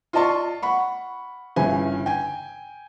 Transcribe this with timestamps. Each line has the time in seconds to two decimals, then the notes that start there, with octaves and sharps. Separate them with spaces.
0.13 F4 D5 D#5 A5 C6 C#6
0.62 F#5 B5 C#6
1.56 G1 G2 C#3 E3 E4 G#5
2.06 G5 G#5